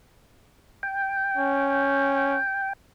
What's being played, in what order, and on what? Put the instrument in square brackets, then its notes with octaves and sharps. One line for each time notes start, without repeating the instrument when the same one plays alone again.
[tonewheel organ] G5
[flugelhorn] C#4